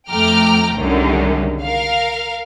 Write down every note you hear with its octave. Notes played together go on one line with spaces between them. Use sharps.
F2 A3 G5 A#5 D6 F6
C2 F#2 D3 D#3 G3 G#3
A#4 F5